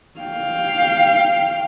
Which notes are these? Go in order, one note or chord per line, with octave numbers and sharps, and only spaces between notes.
F5 G5